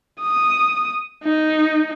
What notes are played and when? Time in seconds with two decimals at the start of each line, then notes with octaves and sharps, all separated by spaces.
0.21 D#6
1.24 D#4